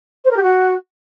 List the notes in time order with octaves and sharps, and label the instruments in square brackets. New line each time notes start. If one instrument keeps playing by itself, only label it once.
[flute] C5
A#4
G4
F#4